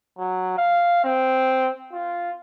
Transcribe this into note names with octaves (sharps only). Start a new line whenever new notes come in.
F#3
F5
C4
F4